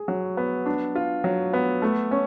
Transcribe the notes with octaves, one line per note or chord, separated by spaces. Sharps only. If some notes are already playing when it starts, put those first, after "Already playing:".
Already playing: G#4
F#3
B3
D4
F4
F#3
B3
A3
C#4